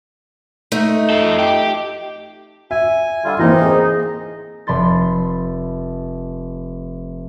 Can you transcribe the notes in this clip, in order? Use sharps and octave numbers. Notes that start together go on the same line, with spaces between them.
A3 D#4
F4 A4
G4
E5 G#5
D3 G3 F4
E3 A#3 C4 D#4 D#5
G#4 C5
F1 B5 C6 A6